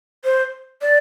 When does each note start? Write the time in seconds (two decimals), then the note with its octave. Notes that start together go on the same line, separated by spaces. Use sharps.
0.24 C5
0.82 D5